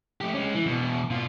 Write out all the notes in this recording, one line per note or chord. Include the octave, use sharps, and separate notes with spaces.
A3 G4
G#3 C#4
E3
E2 B2
B2 F4